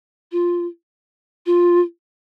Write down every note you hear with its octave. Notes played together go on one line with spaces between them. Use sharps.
F4
F4